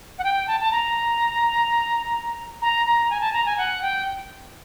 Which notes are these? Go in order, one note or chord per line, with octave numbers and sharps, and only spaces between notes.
F#5
G5
A5
A5
A#5
A#5
A#5
G#5
A5
A#5
G#5
F#5
G5